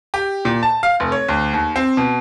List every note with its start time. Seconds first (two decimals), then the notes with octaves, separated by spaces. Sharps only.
0.14 G4
0.45 A#2
0.63 A5
0.83 F5
1.00 F1
1.12 C#5
1.28 D2
1.53 D#2
1.76 C4
1.97 B2